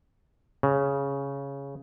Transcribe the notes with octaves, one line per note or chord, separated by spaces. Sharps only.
C#3